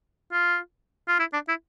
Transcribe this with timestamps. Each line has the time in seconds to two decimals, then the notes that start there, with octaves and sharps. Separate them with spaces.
0.32 F4
1.08 F4
1.19 E4
1.33 D4
1.49 E4